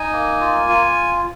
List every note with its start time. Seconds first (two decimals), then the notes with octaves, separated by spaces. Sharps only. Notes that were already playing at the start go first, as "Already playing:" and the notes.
Already playing: D#4 G#5
0.13 A#3
0.41 F4
0.69 F4